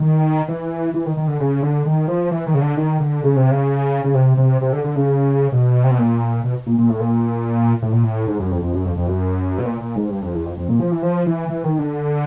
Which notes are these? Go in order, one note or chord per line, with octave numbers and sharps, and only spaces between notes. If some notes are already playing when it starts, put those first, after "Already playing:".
Already playing: D#3
E3
E3
D#3
D#3
D3
C#3
D3
D#3
F3
E3
D#3
C#3
D3
D#3
D3
C#3
C3
C#3
C#3
C3
C3
C3
D3
D3
C#3
B2
C3
B2
A#2
B2
A#2
A#2
A2
A#2
A2
A#2
A2
G#2
F#2
F2
F2
F#2
F2
F2
F#2
B2
A#2
A#2
G#2
G2
F2
E2
F2
F2
A#2
F3
E3
F3
E3
E3
D#3
D3